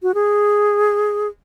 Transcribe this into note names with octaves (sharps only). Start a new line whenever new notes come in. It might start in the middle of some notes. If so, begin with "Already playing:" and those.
F#4
G#4